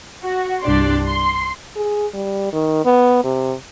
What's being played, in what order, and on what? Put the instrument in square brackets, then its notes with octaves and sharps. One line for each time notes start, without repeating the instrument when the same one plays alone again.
[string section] F#4
C2 G2 D4 G4 D5 C6
C6
[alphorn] G#4
G3
D#3
B3
C3